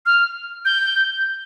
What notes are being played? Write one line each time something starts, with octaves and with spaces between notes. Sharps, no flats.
F6
G6